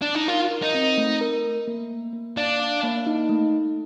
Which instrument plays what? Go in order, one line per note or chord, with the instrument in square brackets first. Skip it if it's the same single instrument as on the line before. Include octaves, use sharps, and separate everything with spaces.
[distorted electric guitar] D4
D#4
[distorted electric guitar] F4 [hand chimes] A#4
[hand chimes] A#4
[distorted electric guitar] D#4
[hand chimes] C4
A3
A#4
A3
A#3
A#3
A#3
[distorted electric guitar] D4 [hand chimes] F5
[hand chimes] F5
A#3
D#4
A3
A3